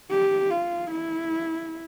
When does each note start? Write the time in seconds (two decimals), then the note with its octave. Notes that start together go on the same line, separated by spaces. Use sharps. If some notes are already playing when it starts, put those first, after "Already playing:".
0.11 G4
0.51 F4
0.91 E4